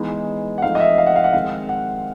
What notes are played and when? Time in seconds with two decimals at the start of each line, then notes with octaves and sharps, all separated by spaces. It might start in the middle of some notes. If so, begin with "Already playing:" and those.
Already playing: E3 G#3 B3 D#4
0.58 F#5
0.62 F3 A3 C4 D#4 F5
0.75 D#5
0.80 E5
0.98 F5
1.07 F#5
1.16 F5
1.24 F#5
1.33 D#3 G#3 C4 F5
1.69 F#5